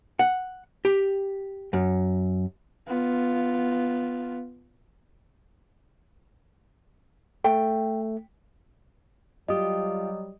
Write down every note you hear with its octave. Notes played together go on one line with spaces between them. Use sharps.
F#5
G4
F#2
B3 F4
A3 G5
F#3 G3 F4 G4 D#5 D#6